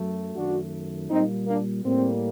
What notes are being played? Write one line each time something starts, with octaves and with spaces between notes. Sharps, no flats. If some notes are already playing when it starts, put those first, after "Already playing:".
Already playing: F#2 F#3 A3
F#2 D#3 A3 D4 F#4
A#2 G3 A#3 C4 D#4
A#3 D4
A2 G3 A#3 C4